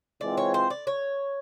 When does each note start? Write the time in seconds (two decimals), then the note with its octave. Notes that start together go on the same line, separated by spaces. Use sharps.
0.21 E3 G#3 C4 F4 D5
0.37 C#5
0.54 C5
0.70 D5
0.87 C#5